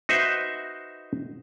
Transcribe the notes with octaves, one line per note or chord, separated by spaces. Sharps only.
D#4 F#4 B4 C5 E5